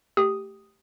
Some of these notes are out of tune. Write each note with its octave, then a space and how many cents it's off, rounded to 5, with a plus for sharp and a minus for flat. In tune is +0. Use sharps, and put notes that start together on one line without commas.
A3 +0 G4 +0 D#6 +0